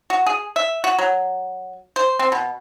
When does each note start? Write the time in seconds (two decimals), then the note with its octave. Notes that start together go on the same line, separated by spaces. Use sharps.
0.10 F#4
0.26 G#4
0.56 E5
0.84 F#4
0.99 F#3
1.96 C5
2.19 C4
2.32 B2